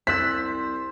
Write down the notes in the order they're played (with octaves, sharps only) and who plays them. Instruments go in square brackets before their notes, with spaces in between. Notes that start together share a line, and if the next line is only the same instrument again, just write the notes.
[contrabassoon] C2 [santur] C5 [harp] E6 F#6 A6 [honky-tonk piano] B6